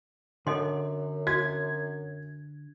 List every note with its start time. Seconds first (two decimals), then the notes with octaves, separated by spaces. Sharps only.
0.47 F#2 D3 A4 D#5 C6
1.27 F#4 G#6